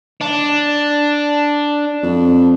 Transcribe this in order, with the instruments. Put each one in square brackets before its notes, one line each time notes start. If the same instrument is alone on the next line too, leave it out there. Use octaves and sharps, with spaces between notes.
[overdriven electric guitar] D4
[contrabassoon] F2